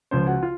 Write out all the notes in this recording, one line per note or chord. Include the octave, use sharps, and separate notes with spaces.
C#2 C#3 F3 C5
F#4
F4